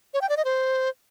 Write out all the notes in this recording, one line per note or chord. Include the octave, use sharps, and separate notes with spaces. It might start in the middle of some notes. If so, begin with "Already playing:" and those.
C#5
G5
D5
D#5
C5